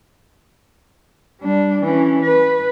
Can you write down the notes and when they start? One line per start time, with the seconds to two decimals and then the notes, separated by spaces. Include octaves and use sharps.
1.41 G3 D4
1.84 E3 C#4
2.23 B4